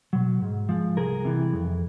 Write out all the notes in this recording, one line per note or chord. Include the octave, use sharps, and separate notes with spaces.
B2 F#3
G#2
F3 G#3
C2 G#4 A#4
C3 E3
F2